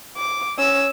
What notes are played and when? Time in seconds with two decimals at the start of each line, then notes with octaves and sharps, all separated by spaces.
0.17 D6
0.58 C#4 E6